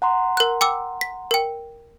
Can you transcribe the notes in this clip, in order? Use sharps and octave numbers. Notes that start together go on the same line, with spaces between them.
F#5 A#5 C6
A#4 F#6
G5 D6 E6
B6
A#4 G5